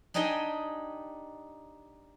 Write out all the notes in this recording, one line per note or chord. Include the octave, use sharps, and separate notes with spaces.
D4 D#4 G4 D#5 G#5